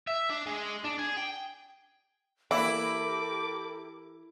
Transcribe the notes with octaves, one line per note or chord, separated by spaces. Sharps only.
E5
D4
G#3
D4
G#4
G5
E3 A#3 E4 G4 A4 A#4 D6